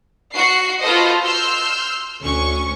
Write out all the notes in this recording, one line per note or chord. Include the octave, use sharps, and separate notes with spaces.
F#4 C7
F4 F#4 A4 B4 C5 D#5
C6 E6 F6 G6
D2 C#4 C#6